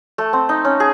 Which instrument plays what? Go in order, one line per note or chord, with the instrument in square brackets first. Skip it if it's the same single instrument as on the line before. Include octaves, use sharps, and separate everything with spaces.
[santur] A3
C4
D#4
C#4
G#4